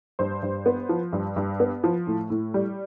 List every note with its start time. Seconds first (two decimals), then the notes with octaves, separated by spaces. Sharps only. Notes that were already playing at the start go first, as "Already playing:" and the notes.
0.19 G2 C5
0.43 G2
0.66 B3
0.89 F3
1.13 G2
1.36 G2
1.60 B3
1.84 F3
2.07 A2
2.30 A2
2.54 G3